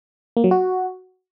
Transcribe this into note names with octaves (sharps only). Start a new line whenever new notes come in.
A#3
F#3
F#4